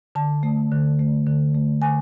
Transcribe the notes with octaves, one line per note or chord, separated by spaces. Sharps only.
D3 A5
A3
D3
A3
D3
A3
D3 G#5